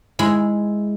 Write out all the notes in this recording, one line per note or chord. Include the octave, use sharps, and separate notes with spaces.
G#3 E4